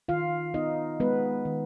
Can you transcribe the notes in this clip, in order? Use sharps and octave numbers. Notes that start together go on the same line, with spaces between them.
D#3 F4 F5
B3 D#4 D#5
G#3 B3 B4
D#3